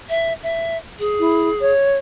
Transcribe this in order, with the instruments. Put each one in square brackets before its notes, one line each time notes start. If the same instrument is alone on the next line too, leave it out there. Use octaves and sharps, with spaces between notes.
[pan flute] E5
E5
G#4
[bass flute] E4
C#5